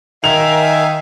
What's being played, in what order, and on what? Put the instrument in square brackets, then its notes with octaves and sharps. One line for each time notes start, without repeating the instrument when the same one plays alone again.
[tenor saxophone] D#3 [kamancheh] A#4 [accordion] E5 F5 G#5 [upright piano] F7